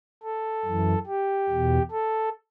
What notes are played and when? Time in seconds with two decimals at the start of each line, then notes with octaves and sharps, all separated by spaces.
0.23 A4
0.65 F#2 E3
1.07 G4
1.49 E2 B2
1.91 A4